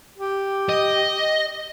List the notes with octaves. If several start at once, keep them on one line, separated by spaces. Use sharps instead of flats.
G4
D#5